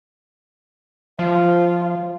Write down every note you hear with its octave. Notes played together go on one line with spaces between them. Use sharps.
F3 F4